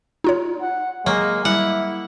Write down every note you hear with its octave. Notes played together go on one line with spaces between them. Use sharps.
D#4 F4 C#5
F#5
F#3 G#3 A#3
G3 E4 F#5